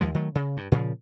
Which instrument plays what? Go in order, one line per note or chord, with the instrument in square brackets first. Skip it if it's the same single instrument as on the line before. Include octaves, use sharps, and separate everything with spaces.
[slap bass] D#2 F3 G#3
D#3 F#3 A3
C#3
G2
A#2 C#3 E3 F3